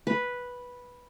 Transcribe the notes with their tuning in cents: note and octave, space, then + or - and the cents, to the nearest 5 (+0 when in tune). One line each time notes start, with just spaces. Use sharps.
B4 -5